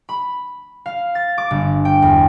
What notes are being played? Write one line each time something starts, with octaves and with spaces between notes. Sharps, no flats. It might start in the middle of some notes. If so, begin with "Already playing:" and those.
B5
F5
A6
D6
G1
G5
E2